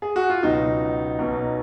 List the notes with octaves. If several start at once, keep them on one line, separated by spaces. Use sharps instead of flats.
G#4
F#4
F4
C#2 B2 F#3 D#4
B1 B2 F#3